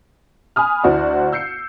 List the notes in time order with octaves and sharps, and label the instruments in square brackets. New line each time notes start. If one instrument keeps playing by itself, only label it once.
[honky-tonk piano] G#5 B5 D#6 F6
D2 E4 F#4 C5 D5
E6 G6 C7 C#7